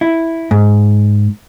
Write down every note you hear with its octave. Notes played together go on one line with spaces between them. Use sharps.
E4
G#2